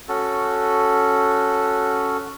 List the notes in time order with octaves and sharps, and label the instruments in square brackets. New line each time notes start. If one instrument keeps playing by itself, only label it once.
[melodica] C#4 F#4 A4